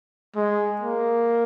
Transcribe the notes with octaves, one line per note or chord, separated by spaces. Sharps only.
G#3
A#3